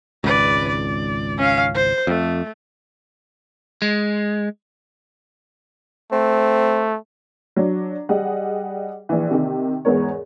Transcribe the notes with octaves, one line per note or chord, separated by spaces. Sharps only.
G#1 C#2 B4 D5
D5
C#4 F5
C5
F2 A3
G#3
A3 C4
F#3 D4
G3 G#4 D#5 F#5
A#1 E3
C3 D#3
E2 G#2 B3 A#4 C#5